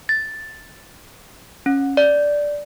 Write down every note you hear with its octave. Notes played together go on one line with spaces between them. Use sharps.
A6
C#4
D5